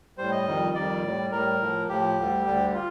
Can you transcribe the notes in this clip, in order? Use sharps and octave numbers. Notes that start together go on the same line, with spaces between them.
A2 G3 C5
D#5
F2 D#3 G3
F2 D#3 G3 D5
A2 G3
A2 G3 A#4
A2 F3
A2 F3 G4
D2 D3 G3
D2 D3 G3
F4